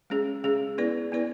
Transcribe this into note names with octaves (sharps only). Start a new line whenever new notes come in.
G#3 C#4 G#4
G#3 C#4 G#4
B3 E4 B4 D5
B3 E4 B4 D5